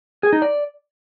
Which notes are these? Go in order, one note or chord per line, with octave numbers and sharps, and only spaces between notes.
G#4
D#4
D5